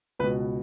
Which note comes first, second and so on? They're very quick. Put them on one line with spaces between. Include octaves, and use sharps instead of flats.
C#2 B4 B2